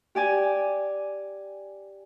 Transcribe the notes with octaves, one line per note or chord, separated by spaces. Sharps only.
G4 D5 G#5